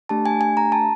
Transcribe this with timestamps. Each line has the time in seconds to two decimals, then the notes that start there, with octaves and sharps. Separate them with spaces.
0.09 A3 D4 G4 A5
0.26 G#5
0.41 G#5
0.57 A#5
0.72 A5